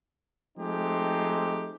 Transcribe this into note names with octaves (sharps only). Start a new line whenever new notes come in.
F3 G#3 A3 C4 D#4 G4